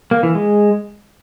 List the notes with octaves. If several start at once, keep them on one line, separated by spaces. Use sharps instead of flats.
A#3
E3
G#3